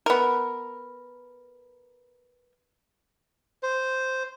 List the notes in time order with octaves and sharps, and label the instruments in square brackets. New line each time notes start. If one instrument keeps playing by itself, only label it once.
[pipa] B3 A#4
[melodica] C5